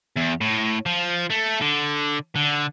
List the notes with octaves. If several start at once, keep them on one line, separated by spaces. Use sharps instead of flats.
E2
A2
F3
A3
D3
D3